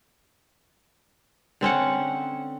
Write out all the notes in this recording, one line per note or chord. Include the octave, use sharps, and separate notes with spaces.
D3 C4 C#4 F#5